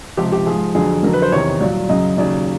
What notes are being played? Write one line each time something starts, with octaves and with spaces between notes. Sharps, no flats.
C#2 C3 F3 G4
G4
G#2 F3 G#4
F2 D3 F#3 G#4
F2 D3 F#3 A#4
B4
C5
E2 C3 D#3 C#5
C2 A#2 F#3 D5
F#2 C#3 F#3 D#5
D#2 C#3 F#3 D5